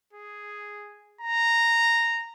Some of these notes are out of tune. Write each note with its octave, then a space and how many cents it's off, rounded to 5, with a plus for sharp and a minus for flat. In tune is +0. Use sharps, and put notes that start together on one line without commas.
G#4 +0
A#5 -10